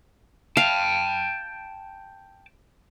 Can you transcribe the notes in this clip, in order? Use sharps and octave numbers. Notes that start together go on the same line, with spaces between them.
F5 G5 A5